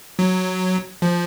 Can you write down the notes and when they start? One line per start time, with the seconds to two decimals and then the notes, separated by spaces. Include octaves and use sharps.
0.19 F#3
1.02 F3